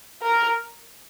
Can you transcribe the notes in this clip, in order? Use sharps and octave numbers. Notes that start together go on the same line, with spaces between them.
A#4